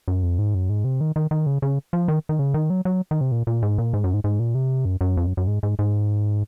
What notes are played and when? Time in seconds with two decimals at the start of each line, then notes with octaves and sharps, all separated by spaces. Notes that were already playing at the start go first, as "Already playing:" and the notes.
0.08 F#2
0.23 F2
0.39 G#2
0.55 F#2
0.69 G#2
0.84 C3
1.01 D#3
1.16 D#3
1.31 D#3
1.46 C#3
1.62 C#3
1.93 F3
2.08 D#3
2.29 D#3
2.39 C#3
2.54 D#3
2.70 F#3
2.85 F#3
3.11 D#3
3.21 C3
3.32 A#2
3.47 A#2
3.62 G#2
3.78 A#2
3.93 G#2
4.04 F#2
4.14 G#2
4.24 G#2
4.39 A#2
4.55 C3
4.85 F#2
5.01 F#2
5.17 F2
5.26 F#2
5.37 F#2
5.47 G#2
5.63 G#2
5.79 G#2